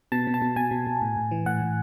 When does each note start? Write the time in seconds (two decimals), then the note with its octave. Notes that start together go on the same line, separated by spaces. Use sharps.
0.12 B2 A5
0.27 B2
0.34 A5
0.42 B2
0.56 B2 G#5
0.71 B2
0.87 B2
1.01 A2
1.16 A2
1.31 E3
1.46 A2 F#5
1.61 A2